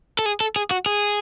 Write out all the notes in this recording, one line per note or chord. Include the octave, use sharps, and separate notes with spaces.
A4
G#4
A4
G#4
F#4
G#4